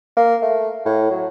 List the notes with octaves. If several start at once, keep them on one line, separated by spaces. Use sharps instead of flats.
A#3
A3
A2
F#3